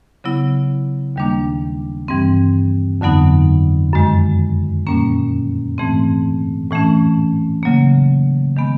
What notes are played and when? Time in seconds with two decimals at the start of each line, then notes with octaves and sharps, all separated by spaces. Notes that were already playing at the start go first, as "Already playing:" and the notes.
0.24 C#3 F#3 B3 E4
1.16 D#2 D#3 G3 A#3 D4
2.08 G2 E3 G3 C4
3.01 F2 D3 F#3 B3 D#4
3.93 F#2 D#3 G#3
4.87 A#2 G3 A#3 C#4
5.78 G#2 E3 A3 C4
6.71 A2 E3 A3 C#4
7.63 C#3 F#3 A#3
8.57 D#3 G#3 B3